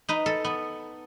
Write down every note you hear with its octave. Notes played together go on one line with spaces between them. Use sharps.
D#4 B4
A4
B3